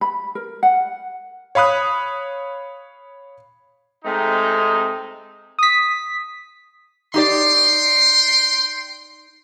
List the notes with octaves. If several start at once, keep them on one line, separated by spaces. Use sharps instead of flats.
B5
A#4
F#5
C#5 F5 B5 D#6 F#6
C3 G#3 A3 C4 D#4
D#6 B6
D#4 G4 D5 G5 C6